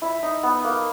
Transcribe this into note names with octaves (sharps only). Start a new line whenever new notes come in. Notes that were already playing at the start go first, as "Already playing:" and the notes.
E4
D#4
B3
A#3